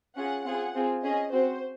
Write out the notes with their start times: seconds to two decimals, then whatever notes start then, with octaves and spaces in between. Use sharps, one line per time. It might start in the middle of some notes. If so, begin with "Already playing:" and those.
0.17 C#4 F4 G#4 F#5
0.45 C4 F4 G#4 F#5
0.75 C4 F4 G#4
1.03 C#4 G#4 D#5
1.32 C4 F#4 C5